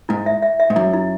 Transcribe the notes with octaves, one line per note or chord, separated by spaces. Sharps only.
G#2 E4
E5
E5
E5
G#2
F#2 E4
E4